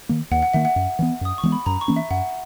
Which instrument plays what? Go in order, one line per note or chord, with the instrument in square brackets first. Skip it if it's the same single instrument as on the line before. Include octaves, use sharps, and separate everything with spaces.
[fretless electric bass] D#3 A#3
[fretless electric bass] D#2 [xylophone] F#5
[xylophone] F#5
[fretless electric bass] D#3 A#3 [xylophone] E5
[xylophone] F#5
[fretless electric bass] F#2
E3 G#3 B3
[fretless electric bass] F#2 [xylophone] D#6
[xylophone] C#6
[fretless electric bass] E3 G#3 B3
[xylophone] B5
[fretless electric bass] F#2 [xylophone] A#5
[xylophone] C#6
[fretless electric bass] E3 A#3 C#4
[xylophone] E5
[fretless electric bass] F#2 [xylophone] F#5